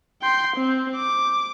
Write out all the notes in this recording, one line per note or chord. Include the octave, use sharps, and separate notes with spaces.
G5 C6
C4
D6